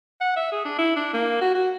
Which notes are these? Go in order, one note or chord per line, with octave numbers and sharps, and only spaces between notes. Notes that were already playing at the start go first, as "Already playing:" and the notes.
F#5
E5
G#4
D4
E4
D4
A#3
F#4
F#4